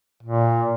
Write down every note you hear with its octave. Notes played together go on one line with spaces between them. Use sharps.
A#2